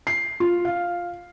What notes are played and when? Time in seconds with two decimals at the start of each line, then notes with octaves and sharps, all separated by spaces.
0.07 C7
0.40 F4
0.65 F5